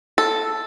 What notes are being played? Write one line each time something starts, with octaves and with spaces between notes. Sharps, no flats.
A4